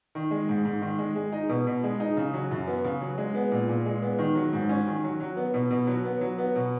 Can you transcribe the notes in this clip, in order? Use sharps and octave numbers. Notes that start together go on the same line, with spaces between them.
D#3
G#3
G#2
G#2
D#3
G#3
G#3
D#4
B2
B2
G#3
D#4
C#3
F#3
F#2
B3
C#3
F#3
G#3
B3
A#2
A#2
G#3
B3
D#3
F#3
G#2
C#4
D#3
F#3
F#3
B3
B2
B2
F#3
B3
F#3
B3
B2